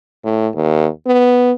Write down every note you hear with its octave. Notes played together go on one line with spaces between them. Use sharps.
A2
D#2
B3